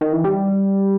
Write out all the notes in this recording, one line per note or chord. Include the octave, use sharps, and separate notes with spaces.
D#3
E3
G3